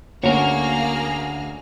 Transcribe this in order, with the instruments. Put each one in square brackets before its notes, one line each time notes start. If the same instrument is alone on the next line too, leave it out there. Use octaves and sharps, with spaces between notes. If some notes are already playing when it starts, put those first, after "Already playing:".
[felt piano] D2 [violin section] A#3 G#4 F6 [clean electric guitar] F#4 A#4 [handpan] C#5